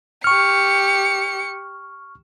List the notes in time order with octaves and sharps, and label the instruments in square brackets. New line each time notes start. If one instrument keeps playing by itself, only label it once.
[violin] G4 C#7 [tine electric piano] C#6 F6